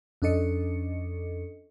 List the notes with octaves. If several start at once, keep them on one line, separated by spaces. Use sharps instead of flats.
F2 C#4 D4 A4 D#5 C#7